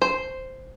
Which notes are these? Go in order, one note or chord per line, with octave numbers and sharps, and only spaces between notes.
C5